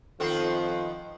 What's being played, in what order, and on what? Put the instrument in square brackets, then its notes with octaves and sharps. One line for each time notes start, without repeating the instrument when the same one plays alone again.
[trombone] F2 [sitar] D#3 B3 C4 [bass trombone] F3 [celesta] A4 C7